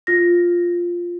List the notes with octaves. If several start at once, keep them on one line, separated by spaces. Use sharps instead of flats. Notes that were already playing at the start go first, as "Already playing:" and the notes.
F4 A#6